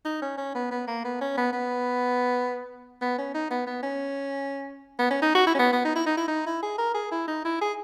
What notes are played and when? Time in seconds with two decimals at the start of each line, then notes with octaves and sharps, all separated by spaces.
0.05 D#4
0.22 C#4
0.38 C#4
0.55 B3
0.71 B3
0.88 A#3
1.05 B3
1.21 C#4
1.37 B3
1.53 B3
3.01 B3
3.18 C#4
3.34 D#4
3.51 B3
3.67 B3
3.83 C#4
4.99 B3
5.11 C#4
5.22 D#4
5.35 F#4
5.47 E4
5.55 C#4
5.59 B3
5.72 B3
5.85 D#4
5.96 E4
6.06 D#4
6.17 E4
6.28 D#4
6.46 E4
6.63 G#4
6.78 A#4
6.94 G#4
7.12 E4
7.28 D#4
7.45 E4
7.61 G#4